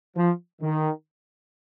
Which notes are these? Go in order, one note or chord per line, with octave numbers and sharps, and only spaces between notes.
F3
D#3